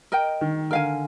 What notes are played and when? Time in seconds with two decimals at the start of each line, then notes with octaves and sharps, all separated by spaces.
0.12 A#4 D#5 G5
0.41 D#3
0.70 D3 A#4 F5 G#5